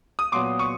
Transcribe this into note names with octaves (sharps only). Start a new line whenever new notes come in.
D#6
A#2 F#3 B3 C6 D6
C#6 D#6